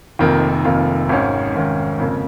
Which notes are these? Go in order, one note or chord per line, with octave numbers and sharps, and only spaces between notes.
F1 F2 D#3 A#3 F4
F1 F2 D#3 A#3 F4
G#1 G#2 D#3 C#4
G#1 G#2 D#3 C#4
F2 C#3 A#3